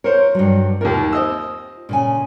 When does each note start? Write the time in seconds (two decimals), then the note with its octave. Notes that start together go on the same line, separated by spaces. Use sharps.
0.04 A#4 C5 C#5
0.35 G2 F#3
0.81 D#2 A#3 F4 A#4
1.12 C4 D#5 E6
1.89 A#2 C#3 G#5